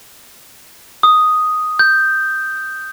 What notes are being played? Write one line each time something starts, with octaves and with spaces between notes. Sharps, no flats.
D#6
G6